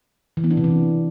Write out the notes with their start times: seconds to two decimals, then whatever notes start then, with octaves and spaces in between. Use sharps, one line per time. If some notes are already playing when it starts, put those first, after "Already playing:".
0.37 E3
0.44 B3
0.51 D4
0.57 C3
0.64 E3